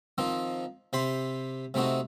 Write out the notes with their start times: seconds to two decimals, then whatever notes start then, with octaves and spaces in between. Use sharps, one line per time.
0.18 D#3 F3 C4 D#4
0.93 C3 G4 B5 C6
1.74 C3 A3 C4 D#4 F#4